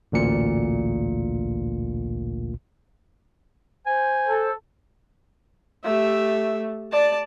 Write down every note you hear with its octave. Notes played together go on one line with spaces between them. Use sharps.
A1 D2 A#2 C#7
C5 G#5
A4
A3 G4 E5
D5 A5